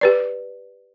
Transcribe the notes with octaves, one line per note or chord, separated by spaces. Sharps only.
G4 B4 D5